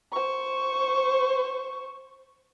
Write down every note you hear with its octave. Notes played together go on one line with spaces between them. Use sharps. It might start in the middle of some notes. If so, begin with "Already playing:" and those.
C5 C#6